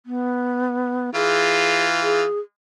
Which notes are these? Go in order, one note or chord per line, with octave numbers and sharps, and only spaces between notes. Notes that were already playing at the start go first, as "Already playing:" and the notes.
B3
E3 F4 G#4
G#4